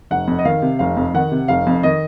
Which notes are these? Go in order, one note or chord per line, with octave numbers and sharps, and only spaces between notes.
F1 F#5
F2
D#5
D#3 F5
C3
F1 F5
F2
D#3 F#5
C3
F1 F5
F2
D#3 D#5